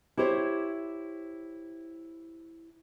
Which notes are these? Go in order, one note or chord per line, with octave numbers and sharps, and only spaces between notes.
E4 G4 C5 C#5